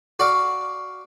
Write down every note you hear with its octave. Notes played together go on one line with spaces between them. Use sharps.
F#4 D5 F5